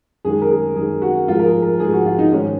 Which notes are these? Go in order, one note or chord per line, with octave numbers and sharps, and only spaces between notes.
F#2 D#3 G#3 G#4
A#4
G#4
F#2 D#3 G#3 G#4
F#4
G#2 F3 G#3 F4
A#4
G#4
A#4
G#2 F3 G#3 G#4
F#4
F4
D#4
G#2 D#3 G#3 C#4